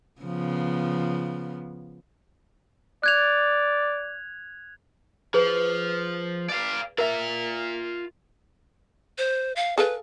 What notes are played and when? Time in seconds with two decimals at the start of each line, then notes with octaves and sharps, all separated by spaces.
0.22 C#3 F3 B3
3.03 D5 F#6 G#6 F7
5.34 F3 G#4 B4
6.49 D5 F5
6.98 F4 A#4 E5 A#5
9.18 C5
9.56 F5
9.78 G#4 A4 B4 F5